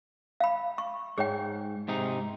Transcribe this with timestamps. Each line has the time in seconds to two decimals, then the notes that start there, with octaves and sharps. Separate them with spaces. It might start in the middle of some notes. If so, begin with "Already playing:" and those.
0.40 F5 B5
0.78 C#6
1.18 G#2 G#4 C#5 G5
1.88 G#2 C3 D#4